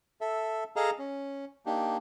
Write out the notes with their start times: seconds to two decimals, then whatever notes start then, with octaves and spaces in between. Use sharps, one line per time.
0.21 A4 E5
0.76 G#4 A4 D#5 F5 A5 A#5
0.99 C#4
1.66 A#3 D4 D#4 G4